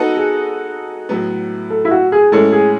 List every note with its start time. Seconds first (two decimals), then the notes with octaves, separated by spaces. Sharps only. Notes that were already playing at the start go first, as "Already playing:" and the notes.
Already playing: B3 D#4 F#4 A4 D#5
0.17 G#4
1.09 A2 F#3 B3
1.70 A4
1.85 E4
1.91 F#4
2.12 G#4
2.32 A2 E3 G#3 C#4 A4
2.52 G#4